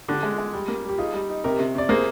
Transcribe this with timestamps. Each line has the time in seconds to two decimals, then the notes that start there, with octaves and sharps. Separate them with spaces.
0.08 D3 G4
0.23 G#3
0.38 G#3
0.53 G3 G4
0.68 A#3
0.84 G3
0.89 G4
0.98 D#4 F4 G#4
1.14 G3
1.29 D#4
1.44 C3 G4 A#4
1.59 C3
1.75 C3 D5
1.89 A#3 G#4 C5